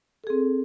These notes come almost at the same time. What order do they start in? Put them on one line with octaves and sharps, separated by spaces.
A4 G#4 C4